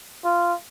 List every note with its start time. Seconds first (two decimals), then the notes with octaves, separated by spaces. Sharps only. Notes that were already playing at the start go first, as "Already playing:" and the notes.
0.25 F4